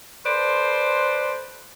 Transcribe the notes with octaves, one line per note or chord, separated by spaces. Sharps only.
A4 B4 C5 D5 C6